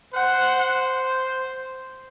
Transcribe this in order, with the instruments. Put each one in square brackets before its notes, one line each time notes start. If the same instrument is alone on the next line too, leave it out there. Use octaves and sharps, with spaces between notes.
[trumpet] C5 [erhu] F#5